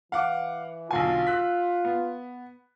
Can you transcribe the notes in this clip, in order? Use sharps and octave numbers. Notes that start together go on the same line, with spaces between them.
E3 F5 F#5 D6
B1 D3 F4 G#5
E6 F#6 B6
B3